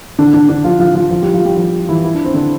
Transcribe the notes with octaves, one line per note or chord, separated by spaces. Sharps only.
D3 D4
D3 D4
D3 D4
F3 F4
F3 F4
F3 F4
F3 F4
G3 G4
F3 F4
G3 G4
F3 F4
E3 E4
E4
D4
C4
D3 D4